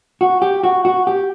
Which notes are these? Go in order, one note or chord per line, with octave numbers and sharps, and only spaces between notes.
F#4
G4
F#4
F#4
G4